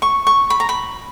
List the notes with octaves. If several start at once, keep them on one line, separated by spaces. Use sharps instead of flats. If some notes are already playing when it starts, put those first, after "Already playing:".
C#6
C#6
B5
A#5
B5